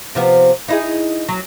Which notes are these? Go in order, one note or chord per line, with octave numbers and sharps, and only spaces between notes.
C3 F3 B3
D#4 E4 G#4
F#3